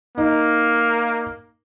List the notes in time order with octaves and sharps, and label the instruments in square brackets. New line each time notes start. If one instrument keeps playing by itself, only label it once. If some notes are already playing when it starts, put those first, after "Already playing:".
[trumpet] A#3 [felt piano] D#4